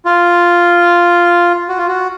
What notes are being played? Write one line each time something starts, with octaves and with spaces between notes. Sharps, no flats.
F4
F#4
F4
F#4